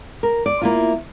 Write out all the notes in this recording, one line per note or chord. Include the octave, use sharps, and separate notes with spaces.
A#4
D5
A#3 E4 F4